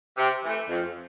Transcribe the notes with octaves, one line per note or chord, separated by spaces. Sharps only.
C3
E3 A3
F2